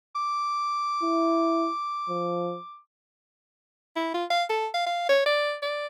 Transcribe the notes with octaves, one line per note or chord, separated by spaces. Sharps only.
D6
E4
F3
E4
F4
F5
A4
F5
F5
C#5
D5
D5